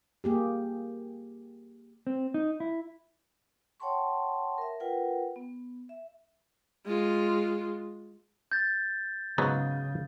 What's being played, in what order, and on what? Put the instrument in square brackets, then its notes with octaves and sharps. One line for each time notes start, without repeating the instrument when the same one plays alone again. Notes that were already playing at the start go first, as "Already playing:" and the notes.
[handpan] A#3 G4 G#4
[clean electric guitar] C4
D#4
E4
[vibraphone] C#5 F#5 G5 A5 C6 C#6
A#4 E5
F4 A#4 B4 F#5 G5
B3
E5
[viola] G#3 F4
[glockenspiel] G6 A6
[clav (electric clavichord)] G#2 F#3 B3 [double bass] C#3